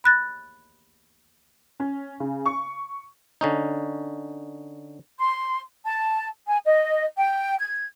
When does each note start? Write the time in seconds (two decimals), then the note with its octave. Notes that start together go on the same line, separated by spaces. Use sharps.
0.04 B5 F#6 A6 A#6
1.80 C#4
2.20 C#3
2.46 C#6
3.41 D3 C#4 D#4
5.19 C6
5.84 A5
6.47 G#5
6.64 D#5
7.17 G5
7.60 G#6